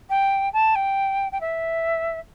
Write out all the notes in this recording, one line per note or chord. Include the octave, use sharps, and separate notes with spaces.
G5
A5
G5
G5
E5